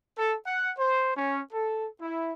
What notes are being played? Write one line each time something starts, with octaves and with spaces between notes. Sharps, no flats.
A4
F#5
C5
C#4
A4
E4